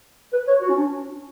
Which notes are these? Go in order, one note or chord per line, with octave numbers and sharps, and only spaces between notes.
B4
C#5
F#4
C#4
D4